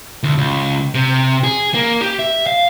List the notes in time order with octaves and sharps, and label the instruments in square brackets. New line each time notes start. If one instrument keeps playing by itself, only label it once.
[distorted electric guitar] D2
C#2
C3
G#4
A#3
G4
E5
F5